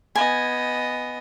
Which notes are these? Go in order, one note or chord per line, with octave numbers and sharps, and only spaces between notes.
B3 D#5 G#5